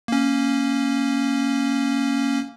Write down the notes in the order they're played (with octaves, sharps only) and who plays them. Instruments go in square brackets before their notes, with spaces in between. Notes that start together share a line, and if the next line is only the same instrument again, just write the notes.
[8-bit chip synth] A#3 C#4